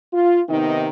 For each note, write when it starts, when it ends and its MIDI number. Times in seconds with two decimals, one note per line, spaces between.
0.13 0.41 65
0.49 0.88 48
0.49 0.88 51
0.49 0.88 59
0.49 0.88 63